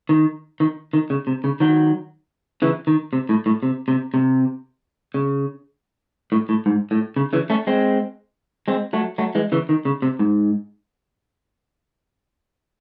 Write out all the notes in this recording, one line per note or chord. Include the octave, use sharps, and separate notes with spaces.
D#3
D#3
D#3
C#3
C3
C#3
D#3 F#3
C#3 E3
D#3
C3
A2
A2
C3
C3
C3
C#3
A2
A2
G#2
A2
C#3
C#3 E3
A3 C#4
G#3 C4
G#3 C4
F#3 A3
F#3 A3
E3 G#3
C#3 E3
D#3
C#3
C3
G#2